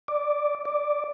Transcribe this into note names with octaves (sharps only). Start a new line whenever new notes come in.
D5
D5